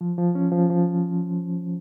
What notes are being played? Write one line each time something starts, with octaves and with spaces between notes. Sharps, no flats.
F3
F3
C#4
F3
F3